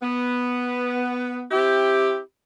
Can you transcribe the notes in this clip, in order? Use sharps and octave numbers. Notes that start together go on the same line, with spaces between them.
B3
C4 E4 G4